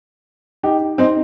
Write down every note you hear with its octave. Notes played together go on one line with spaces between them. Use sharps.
D#4 G4
C4 D#4